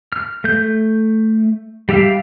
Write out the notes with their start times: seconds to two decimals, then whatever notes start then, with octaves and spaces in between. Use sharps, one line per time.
0.12 F6
0.44 A3 G6
1.89 G3 G4 E5 F5